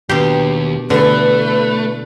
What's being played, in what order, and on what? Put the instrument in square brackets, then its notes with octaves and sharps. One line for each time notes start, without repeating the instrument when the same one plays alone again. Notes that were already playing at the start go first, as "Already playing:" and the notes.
[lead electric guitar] D#2 [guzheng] B2 D4 C6 [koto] G4
[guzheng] B2 E3 [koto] D3 [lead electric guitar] A3 [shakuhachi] B4